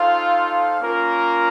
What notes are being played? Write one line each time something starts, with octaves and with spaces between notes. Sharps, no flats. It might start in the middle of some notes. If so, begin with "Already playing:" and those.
Already playing: D#4 F4 A4 C5 F5
A#3 C#4 F4 A#4